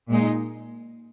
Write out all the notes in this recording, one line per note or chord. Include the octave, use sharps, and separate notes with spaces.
A#2 G#3 D#4